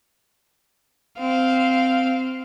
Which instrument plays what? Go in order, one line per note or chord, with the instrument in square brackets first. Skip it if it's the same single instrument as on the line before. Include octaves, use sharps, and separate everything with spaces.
[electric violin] C4 F5